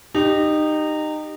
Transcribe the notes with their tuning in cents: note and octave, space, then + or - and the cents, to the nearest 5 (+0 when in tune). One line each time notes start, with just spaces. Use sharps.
D#4 -20 G4 +0